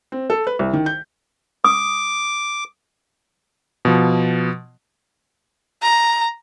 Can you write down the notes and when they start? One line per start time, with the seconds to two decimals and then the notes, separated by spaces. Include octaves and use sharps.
0.12 C4
0.30 A4
0.47 B4
0.59 C2
0.73 D#3
0.86 G6
1.64 D6 D#6
3.85 B2 F3
5.82 A#5